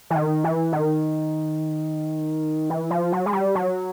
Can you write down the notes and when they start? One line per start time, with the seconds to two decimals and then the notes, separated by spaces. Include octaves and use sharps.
0.10 E3
0.15 D#3
0.44 E3
0.73 D#3
2.70 E3
2.91 F3
3.12 F#3
3.26 G#3
3.33 G3
3.55 F#3